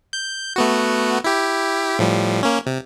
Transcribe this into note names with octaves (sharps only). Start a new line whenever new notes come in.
G6
A3 B3 F#4
E4 G4
A2 F3 G3
A#3 C#4
C3